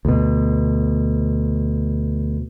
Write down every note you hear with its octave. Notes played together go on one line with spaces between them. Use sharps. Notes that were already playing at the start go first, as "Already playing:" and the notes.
D2 B2